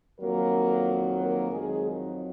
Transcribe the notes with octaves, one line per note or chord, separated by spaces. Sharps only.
F2 D#3 F#3 A#3 A#4
A#3 A#4
F2 D#3 F#3 G#3 G#4
D#3 D#4